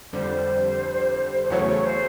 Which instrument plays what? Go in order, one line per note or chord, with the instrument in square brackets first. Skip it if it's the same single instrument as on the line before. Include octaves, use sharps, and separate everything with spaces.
[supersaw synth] F2 D3 G3 [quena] C5
[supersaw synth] E2 C#3 F#3 A3 [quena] C#5
[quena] C#5
C5